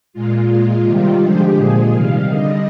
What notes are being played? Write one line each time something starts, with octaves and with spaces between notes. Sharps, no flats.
A#2 G#3 F4
A#2 G#3 F4
C3 D#3 G3 F4
D3 F3 G#3 G4
A#2 F3 G#3 G#4
C3 D#3 G3 F5
D3 G3 D#5